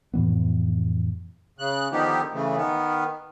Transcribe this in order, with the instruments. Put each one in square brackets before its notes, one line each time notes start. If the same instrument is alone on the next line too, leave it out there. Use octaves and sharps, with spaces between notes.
[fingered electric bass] F2 A2 E3 B3
[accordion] C#3 F#6
D3 D#3 F3 B3 D#4 G4
C#3 E3 A3
D#3 B3